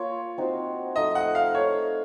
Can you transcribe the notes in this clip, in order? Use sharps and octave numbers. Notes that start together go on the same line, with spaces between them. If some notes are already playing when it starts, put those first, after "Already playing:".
Already playing: A#3 F4 A#4 C#5
C4 D#4 F#4 C5
F3 A3 D#4 A4 D#5
F#5
F5
D#4 A4 C#5 D#5